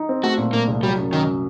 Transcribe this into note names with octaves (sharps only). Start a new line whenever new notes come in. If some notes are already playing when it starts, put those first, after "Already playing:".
Already playing: D#4
C4
A3 F#4
A#2
A#2 A#3
C2
F#3 G3
F#2
F#2 D#3